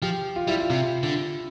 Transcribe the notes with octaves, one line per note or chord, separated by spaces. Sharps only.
F3 G4
F4
G3 E4
F4
C3
D3